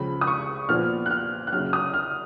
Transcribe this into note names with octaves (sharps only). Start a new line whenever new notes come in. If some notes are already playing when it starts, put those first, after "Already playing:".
Already playing: C#2 C#3 F3 B5
D#6
C#6
A#2 F3 B3 F6
F#6
F6
F#6
F#2 C#3 F#3 F6
D#6
F6